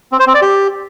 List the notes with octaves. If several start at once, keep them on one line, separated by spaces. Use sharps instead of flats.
C4
C5
C4
D5
G4